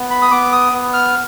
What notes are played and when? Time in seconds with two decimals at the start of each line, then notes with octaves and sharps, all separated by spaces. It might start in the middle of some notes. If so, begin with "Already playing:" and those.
Already playing: B3
0.10 B5
0.22 D#6
0.31 B3 D6
0.52 D#6
0.72 B3
0.94 F6